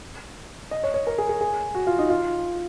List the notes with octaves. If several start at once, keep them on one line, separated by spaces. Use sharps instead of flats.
D#5
C#5
C#5
A#4
G#4
G#4
G#4
F#4
F4
D#4
F4